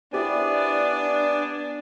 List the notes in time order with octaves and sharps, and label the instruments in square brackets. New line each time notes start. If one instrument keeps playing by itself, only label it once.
[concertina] B3 D5 G#5 [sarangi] D4 [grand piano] E4 G4 C5